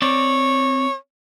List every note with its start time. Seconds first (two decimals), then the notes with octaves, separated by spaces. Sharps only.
0.02 C4 C#5 D5